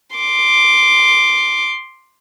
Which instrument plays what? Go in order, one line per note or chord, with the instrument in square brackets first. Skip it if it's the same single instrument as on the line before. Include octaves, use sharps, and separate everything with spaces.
[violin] C6 D6